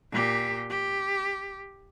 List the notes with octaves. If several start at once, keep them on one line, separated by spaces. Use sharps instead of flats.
A#2 G4
G4